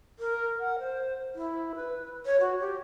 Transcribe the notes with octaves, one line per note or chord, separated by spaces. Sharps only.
A#4
F#5
C5
E4
B4
C#5
F#4
G4